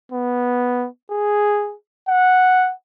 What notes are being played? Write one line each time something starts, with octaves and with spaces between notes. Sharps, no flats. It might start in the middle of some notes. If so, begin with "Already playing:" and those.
B3
G#4
F#5